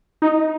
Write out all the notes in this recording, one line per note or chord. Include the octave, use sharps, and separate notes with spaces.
D#4